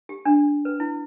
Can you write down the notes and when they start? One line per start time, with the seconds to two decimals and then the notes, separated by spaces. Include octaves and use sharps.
0.09 G4
0.25 D4
0.65 B4
0.80 E4